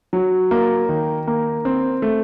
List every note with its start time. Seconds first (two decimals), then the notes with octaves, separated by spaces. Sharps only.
0.13 F#3
0.51 A#3
0.89 D#3
1.27 A#3
1.65 C4
2.02 A3